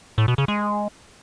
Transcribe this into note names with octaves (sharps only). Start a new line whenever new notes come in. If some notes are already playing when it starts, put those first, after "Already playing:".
A2
B2
C#3
G#3